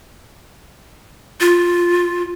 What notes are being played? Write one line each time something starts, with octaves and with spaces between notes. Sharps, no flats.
F4